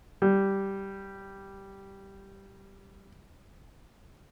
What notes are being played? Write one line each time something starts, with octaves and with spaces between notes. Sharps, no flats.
G3